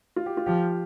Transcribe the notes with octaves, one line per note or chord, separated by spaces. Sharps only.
F4
G4
F4
F3 G4